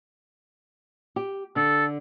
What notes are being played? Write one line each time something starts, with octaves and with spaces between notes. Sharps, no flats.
G4
D3 A4